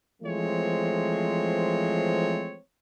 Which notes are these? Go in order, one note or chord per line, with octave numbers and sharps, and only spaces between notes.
E3 F3 G#3 A3 C4 C#5